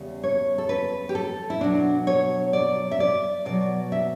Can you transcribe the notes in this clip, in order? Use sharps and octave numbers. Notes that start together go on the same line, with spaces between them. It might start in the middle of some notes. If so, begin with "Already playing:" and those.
Already playing: E2 C#3 G3
C#5
A4
B4
G4
A4
E4
B2 F#3 D4
C#5
D5
E5
D5
B2 F#3 D5
E5